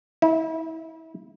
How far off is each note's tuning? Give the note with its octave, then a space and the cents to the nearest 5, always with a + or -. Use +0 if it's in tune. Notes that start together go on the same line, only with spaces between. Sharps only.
E4 -35